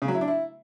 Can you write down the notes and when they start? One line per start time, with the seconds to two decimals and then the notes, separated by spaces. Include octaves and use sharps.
0.02 C#3
0.08 F#3
0.15 E4
0.21 D4
0.28 E4